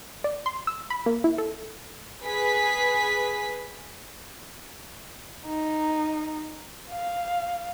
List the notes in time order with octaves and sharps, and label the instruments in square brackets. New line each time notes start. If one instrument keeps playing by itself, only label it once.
[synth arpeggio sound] D5
C6
E6
B5
A#3
E4
A4
[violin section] G#4 B4 B6
[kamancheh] D#4
F5